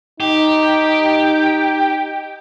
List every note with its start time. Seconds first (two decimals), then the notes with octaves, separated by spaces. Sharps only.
0.20 D#4 G4